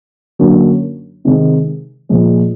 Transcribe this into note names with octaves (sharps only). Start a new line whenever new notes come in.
F#2 D3 F#3 A#3 D4
C3 D#3 G#3
A#2 F3 G#3